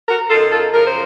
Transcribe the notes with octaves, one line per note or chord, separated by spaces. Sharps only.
F#4 A#4
F#2 D#3 F4 A4
F4 A4
F#2 C#3 F3 A#4
C5